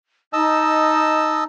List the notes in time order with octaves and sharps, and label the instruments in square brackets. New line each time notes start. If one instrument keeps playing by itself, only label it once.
[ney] D#4 [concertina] D#5 A5 E6